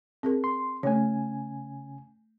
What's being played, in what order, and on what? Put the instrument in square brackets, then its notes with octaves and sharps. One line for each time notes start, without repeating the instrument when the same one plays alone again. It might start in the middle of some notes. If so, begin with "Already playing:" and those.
[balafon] C4 G#4 A#4
[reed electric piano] C6
[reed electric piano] C#3 C#4 G#5 [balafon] A3 C#5